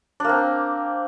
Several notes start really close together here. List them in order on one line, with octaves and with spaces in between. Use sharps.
D4 A#3 C4